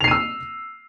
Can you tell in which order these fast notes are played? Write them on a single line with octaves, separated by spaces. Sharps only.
F7 C7 D#7 E6